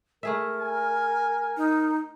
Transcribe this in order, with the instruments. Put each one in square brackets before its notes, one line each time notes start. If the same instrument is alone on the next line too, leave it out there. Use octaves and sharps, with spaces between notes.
[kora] A3 G#4 E5 [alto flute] A#4
[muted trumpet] G#5
[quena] D#4